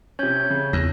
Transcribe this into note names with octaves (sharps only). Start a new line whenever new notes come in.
C3 C#4 C#5 G6
C#3
E2 A#6